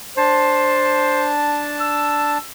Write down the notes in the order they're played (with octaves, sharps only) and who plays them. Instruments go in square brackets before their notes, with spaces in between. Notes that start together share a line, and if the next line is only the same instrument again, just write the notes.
[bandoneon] D4 A5 [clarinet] C5
[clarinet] E6